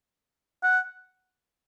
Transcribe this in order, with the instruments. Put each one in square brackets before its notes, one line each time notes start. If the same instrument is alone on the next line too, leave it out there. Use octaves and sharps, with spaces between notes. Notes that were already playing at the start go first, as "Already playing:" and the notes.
[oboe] F#5